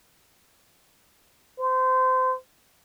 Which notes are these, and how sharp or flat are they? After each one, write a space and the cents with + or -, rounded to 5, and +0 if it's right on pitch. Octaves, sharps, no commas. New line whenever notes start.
C5 -25